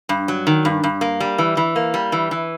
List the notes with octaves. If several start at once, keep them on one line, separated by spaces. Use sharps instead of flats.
G2
F#3
D#3
G2
G2
A#3
G3
E3
E3
A#3
G3
E3
E3